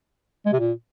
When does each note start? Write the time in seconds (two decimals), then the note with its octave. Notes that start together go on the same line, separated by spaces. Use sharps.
0.46 G#3
0.53 C3
0.59 A#2